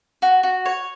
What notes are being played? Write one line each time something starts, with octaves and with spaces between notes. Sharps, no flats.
F#4
F#4
C#5